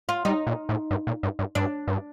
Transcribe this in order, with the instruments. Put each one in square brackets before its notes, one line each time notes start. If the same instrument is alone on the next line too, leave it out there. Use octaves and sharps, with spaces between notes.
[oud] F4
[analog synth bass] G3 [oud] D#4
[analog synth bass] A#2
A2
G2
A#2
G2
G2
[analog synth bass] G2 [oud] D4
[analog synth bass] G2